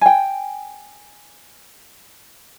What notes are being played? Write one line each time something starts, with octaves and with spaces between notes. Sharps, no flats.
G5 G#5